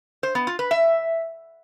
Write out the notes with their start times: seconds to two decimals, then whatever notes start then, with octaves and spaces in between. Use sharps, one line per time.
0.23 C5
0.35 B3
0.47 F4
0.59 B4
0.71 E5